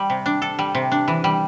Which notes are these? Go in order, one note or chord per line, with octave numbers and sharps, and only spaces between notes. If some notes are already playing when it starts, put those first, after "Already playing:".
Already playing: G3
C3
D4
A4
G3
C3
D4
E3
G3